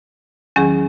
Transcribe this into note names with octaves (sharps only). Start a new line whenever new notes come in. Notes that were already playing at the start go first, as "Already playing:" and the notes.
E2 D#3 F#3 C#4 G#4